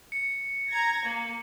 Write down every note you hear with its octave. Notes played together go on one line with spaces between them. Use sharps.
C#7
A#5 G#6 A#6
A#3